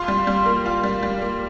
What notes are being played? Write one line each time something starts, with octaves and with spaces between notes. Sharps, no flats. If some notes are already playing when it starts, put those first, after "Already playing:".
Already playing: F4 C6
G3
G3
A#3
F4
G3
G3
A#3